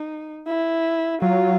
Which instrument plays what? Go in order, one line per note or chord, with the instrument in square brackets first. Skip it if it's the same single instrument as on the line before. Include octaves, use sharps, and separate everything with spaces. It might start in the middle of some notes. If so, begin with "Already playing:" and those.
Already playing: [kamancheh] D#4
E4
[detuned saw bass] F#3 [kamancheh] F4